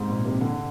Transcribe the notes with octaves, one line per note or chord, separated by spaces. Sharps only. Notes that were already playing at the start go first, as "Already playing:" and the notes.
Already playing: G#2 C3
A#2
C3
D3